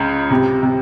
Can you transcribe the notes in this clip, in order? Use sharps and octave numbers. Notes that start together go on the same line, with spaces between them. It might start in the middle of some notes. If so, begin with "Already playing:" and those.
Already playing: C#2 C#3
C3
C3